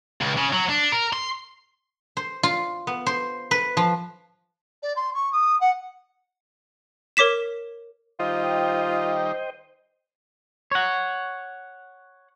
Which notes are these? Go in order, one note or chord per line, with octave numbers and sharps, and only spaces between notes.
C#2
C#3
F#3
D4
A#4
C6
C5
F4
B3
C5
B4
F3
D5
C6
C#6
D#6
F#5
A#4 C#5 D6 B6 E7
D#3 G3 D#4 F4 C5 D#5 G5
C#5 F#5